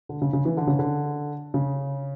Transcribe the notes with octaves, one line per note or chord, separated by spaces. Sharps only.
D3
C#3
C#3
E3
D3
C#3
D3
C#3